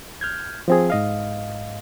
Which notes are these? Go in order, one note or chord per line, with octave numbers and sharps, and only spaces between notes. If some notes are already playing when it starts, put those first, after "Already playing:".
F6 G6 G#6
F3 C4 G#4
G#2 D#5 F5